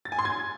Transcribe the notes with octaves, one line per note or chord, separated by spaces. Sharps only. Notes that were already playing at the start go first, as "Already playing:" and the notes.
A6
G#5
C6
G#6